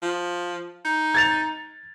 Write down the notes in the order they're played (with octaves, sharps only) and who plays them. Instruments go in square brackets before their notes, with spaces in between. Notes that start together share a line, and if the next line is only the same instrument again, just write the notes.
[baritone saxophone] F3
D#4
[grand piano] G#6 A6 F7